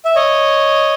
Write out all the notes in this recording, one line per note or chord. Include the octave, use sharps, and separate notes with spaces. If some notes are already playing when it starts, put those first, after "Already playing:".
E5
C#5 D#5